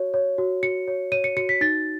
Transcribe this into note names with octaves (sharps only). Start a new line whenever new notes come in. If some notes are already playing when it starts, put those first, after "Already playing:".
Already playing: F#4 C#5
C#5
F#4
F#4 C#7
C#5
C#5 D#7
C#7
F#4 C#7
B6
D#4 A6